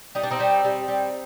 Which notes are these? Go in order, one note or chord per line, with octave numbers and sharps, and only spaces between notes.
G3 D#4
D4
C4 D#4
G3
G3
G3